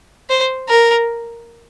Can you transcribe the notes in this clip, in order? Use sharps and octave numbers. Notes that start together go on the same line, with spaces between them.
C5
A#4